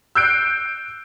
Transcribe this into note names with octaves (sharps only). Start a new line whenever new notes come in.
E6 F#6 G6 C7 D7